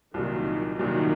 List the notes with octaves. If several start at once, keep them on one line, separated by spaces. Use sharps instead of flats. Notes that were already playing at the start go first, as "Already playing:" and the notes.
C2 A#2 D#3 F#3
C2 A#2 D#3 F#3